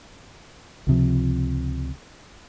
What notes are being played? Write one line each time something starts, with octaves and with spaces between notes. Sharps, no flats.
C#2 C3 F3